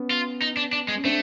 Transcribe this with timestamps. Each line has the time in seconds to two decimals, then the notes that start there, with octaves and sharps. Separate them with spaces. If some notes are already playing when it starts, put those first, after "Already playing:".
Already playing: B3 C#4
0.11 F4
0.42 D#4
0.57 D4
0.73 D4
0.88 G#3
0.97 C#4
1.04 A3 C4 D4